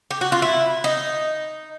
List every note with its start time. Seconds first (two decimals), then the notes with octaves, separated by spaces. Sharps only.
0.11 G4
0.21 F#4
0.32 F4
0.42 E4
0.84 D#4